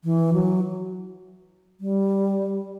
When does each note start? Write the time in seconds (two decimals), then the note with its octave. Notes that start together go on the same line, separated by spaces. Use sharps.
0.04 E3
0.33 F#3
1.80 G3